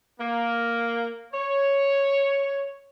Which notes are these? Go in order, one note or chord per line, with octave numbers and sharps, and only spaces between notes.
A#3
C#5